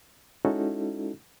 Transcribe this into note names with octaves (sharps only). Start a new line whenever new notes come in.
G#3 C#4 D#4 E4 F#4 A4